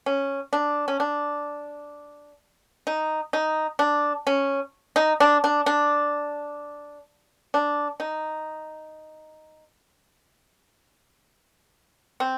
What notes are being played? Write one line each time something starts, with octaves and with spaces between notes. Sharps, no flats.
C#4
D4
C#4
D4
D#4
D#4
D4
C#4
D#4
D4
D4
D4
D4
D#4
C4